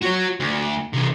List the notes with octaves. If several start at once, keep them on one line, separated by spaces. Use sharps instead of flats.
F#4 C#5
D2
C3 E3